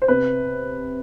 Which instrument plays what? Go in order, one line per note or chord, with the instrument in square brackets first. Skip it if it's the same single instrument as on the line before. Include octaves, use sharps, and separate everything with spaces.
[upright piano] C5
C3 B4